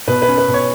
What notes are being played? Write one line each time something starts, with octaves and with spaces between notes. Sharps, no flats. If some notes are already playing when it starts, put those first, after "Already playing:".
B2 B4
B4
C#4
B4
B2
C#5